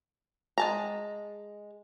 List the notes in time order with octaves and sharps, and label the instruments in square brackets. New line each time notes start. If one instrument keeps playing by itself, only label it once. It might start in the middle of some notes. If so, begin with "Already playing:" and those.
[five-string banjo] G#3 A5 A#5